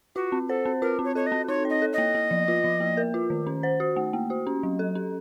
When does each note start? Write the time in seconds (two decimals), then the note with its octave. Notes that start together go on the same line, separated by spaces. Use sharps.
0.15 F4 F#4
0.32 C4
0.49 A4 C5
0.65 C4
0.82 F4 A#4
0.99 C4
1.05 C#5
1.15 A4 C#5
1.26 D#5
1.32 C4
1.48 D#4 C#5
1.65 C#5 D#5
1.82 A4
1.93 D#5
1.98 A#3
2.15 A#3
2.31 F3
2.48 F4
2.64 F3
2.80 A#3
2.97 A#4
3.14 F4
3.30 D#3
3.47 C#4
3.63 C5
3.80 F#4
3.96 A3
4.13 A#3
4.30 F#4
4.47 C#4
4.63 F#3
4.79 A4
4.95 C#4